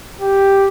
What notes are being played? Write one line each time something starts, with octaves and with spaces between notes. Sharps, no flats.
G4